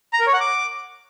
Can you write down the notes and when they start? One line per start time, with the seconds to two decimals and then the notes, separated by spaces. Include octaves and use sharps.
0.13 A#5
0.20 A#4
0.27 C#5
0.33 F#5
0.40 D6